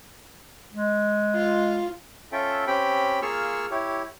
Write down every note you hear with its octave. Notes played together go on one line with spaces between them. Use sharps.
G#3
F4
C#4 F4 A4 E5 G5
C4 C#4 G4 G5 B5
A#3 F4 G#4 C#6 E6 F6
E4 G4 C#5